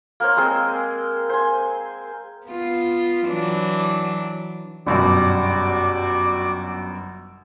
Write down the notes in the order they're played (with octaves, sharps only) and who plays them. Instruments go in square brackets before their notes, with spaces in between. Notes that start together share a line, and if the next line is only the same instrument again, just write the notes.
[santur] A#3 A#4 C5 C#5
G#3 C4 G#4 E6
C5 G#5
[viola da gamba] B3 F4
E3 F#3 D4
[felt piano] G1 F#2 B2 [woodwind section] G3 F#4 D6